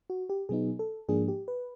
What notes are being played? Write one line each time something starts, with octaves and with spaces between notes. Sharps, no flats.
F#4
G4
B2 F#3 B3 D#4 G#4
A4
G#2 F3 A#3 D4 G#4
G4
B4